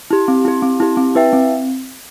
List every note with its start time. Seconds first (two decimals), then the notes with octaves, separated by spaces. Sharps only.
0.11 E4 G4
0.28 C4
0.45 E4 G4
0.62 C4
0.80 E4 G4
0.97 C4
1.15 E4 B4 E5 G5
1.33 C4